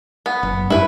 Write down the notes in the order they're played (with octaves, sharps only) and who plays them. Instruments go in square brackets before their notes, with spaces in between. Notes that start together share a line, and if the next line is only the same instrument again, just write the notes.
[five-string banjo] B3
[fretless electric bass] F#1
[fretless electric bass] G2 [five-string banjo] E4 B4